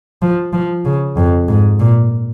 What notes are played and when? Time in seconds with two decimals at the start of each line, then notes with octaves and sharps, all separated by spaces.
0.22 F3
0.53 F3
0.86 C#3
1.17 F2
1.48 G#2
1.80 A#2